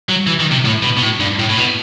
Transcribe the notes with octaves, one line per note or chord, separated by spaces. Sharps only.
F#3
E3
D#3
C3
A2
B2
B2
A2
G2
A2
A2
B2